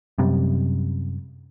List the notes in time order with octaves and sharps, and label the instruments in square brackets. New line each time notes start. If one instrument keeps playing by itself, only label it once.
[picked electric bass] F#2 C3 G3